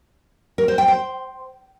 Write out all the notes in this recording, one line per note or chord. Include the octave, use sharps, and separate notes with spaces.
A#4
C5
G5
C5